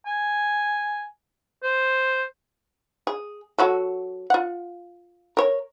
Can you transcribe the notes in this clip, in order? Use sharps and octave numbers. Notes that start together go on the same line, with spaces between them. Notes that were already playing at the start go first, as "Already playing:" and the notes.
G#5
C5
G#4
F#3 F#4 A4
F4 F#5
A#4 C#5